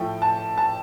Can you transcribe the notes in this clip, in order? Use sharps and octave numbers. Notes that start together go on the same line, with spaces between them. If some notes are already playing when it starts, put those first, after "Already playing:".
Already playing: A2 F3 A3 G5
A5
A5